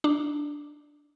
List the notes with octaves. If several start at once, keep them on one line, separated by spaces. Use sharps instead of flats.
D4